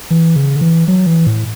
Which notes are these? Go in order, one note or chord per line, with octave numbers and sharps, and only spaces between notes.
E3
C#3
D3
E3
F#3
E3
A2